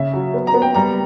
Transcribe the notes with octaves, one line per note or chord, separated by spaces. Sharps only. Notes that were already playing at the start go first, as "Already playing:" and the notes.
Already playing: C#3 E5
F#3
B3
A#5
B3
G5
G3 A#5